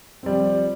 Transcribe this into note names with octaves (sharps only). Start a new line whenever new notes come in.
F3 G3 C4